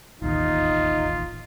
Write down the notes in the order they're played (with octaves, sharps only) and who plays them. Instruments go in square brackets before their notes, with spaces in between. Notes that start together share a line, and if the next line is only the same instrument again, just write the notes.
[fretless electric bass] E1 A1 D#2 [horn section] D#4 [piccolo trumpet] F4